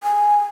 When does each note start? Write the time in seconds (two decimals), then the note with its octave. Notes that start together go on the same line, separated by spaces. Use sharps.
0.04 G#5